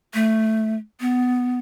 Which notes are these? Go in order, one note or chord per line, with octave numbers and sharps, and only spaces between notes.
A3
B3